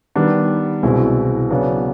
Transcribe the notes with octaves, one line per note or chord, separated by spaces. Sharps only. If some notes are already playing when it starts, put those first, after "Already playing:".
D#3 G3 B3 D4
C2 B2 G#3 C4 E4
C#3 F#3 B3 D4